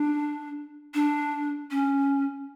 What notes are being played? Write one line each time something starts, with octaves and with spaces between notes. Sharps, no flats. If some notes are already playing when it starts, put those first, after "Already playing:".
Already playing: D4
D4
C#4